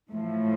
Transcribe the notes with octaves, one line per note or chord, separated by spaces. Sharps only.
A2 F3